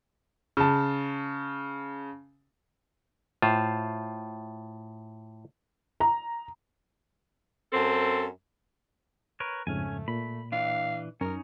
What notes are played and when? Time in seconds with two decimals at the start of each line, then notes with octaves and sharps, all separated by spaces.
0.57 C#3 A5
3.42 A2 F4 C5
6.00 A#5
7.72 F#2 C4 A4
9.40 A#4 B4 C#5
9.67 F2 G#2 C#3 A3 C#4 G#5
10.08 A#2 B5
10.52 E3 D4 F5
11.21 F#2 C#4 D#4 A#4